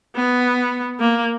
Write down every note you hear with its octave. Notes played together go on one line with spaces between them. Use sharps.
B3
A#3